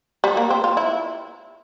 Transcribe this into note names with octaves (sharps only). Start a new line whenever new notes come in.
G3
A#3
C4
F4
E4